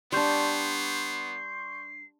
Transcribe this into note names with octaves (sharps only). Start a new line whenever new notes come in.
G3 B3 D4 C6 C#6 G6 C7